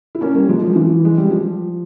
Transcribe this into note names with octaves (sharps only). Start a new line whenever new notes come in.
E4
A#3 C#4
G3 A#3
F3 G#3
F3
E3
G#3
G3
F3